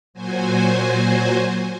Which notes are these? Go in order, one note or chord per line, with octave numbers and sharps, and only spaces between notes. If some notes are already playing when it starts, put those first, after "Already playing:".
A#2 F#3 F#4 C5 G#5